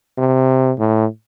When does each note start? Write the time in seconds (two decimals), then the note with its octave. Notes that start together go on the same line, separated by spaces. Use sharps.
0.18 C3
0.79 A2